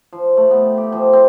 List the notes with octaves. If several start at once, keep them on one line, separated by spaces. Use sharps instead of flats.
F3
A3
B3
G5
G4
F3
C4